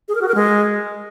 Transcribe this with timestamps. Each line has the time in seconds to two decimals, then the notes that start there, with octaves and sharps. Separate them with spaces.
0.08 G#4
0.15 A#4
0.22 F#4
0.28 A#4
0.35 G#3